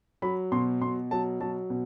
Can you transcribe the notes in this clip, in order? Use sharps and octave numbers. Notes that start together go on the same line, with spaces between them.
F#3 B5
B2 C6
B2 C6
F#3 A5
F#3 A5
B2